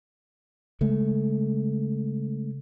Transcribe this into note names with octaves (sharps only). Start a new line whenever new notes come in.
C#3 G#3 A3